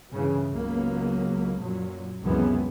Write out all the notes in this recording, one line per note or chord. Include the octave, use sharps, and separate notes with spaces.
G2 C#3 E3
C#2 F#3 A#3 B3
F#2 A#2 F#3
C#2 F#2 C3 E3 G#3 B3